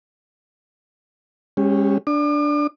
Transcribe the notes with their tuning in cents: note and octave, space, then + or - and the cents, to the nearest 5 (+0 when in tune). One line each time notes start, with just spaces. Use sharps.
G#3 -35 C#4 -10 G4 +0
D4 +0 D6 +45